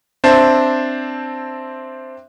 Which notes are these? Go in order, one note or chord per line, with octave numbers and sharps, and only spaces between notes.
C4 D4 C5 E5 A5